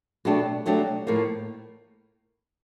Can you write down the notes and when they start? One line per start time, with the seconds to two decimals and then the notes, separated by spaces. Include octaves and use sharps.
0.25 B2 F#3 A3 D4 G4
0.66 B2 F#3 A3 D4 G4
1.07 A2 F3 A#3